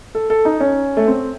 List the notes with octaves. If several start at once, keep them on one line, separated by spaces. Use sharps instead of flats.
A4
A4
D#4
C#4
A3
C4